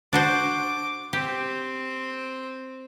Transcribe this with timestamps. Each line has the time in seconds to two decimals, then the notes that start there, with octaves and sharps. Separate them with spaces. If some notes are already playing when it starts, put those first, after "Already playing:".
0.13 D4 F#4 C5 D6
1.13 C4 G4